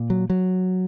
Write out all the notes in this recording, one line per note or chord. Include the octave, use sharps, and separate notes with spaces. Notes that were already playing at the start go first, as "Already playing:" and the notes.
Already playing: A#2
F#3
F#3